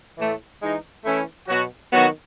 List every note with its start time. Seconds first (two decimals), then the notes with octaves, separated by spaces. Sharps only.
0.18 A2 E3 A3
0.61 E3 G#3 D#4
1.05 E3 A3 C#4 E4
1.48 B2 F#3 B3 F#4
1.92 D#3 F#3 B3 F#4